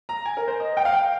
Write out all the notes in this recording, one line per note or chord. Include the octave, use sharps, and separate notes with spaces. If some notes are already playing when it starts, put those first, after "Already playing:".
A#5
G#5
A#4
C5
D#5
G5
F5
G5